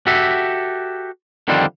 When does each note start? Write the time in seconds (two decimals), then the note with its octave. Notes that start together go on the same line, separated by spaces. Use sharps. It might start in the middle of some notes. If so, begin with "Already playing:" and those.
0.07 F#4 G4 A4 E5
1.48 D3 D#3 F3 G3 C4 D4